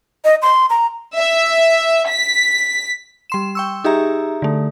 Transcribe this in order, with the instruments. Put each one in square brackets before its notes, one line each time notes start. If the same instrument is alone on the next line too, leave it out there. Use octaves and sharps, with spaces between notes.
[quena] D#5
C6
A#5
[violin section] E5
B6
[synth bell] G3 C6 E7
G5 C#6 E6
D#4 G4 G#4 E5 A#5
D3 A3